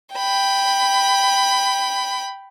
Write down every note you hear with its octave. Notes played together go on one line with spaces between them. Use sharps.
G5 B5